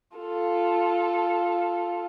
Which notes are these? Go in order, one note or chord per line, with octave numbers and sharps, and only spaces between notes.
F4 A4